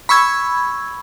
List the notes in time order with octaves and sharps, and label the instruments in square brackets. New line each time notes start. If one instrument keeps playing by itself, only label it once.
[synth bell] B5 C#6 E6 G#6